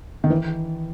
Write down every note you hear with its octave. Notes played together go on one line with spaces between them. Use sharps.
D#3
E3